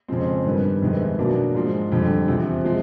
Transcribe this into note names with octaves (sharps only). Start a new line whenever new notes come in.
F2 C#3 F3 G#3 C4
G2 D#3 G3 B3
F2 C3 D#3 G#3 B3
B2 F#3 A#3 D4
G#2 F3 G#3
F2 D3 G3
E2 C3 F3
F3 G#3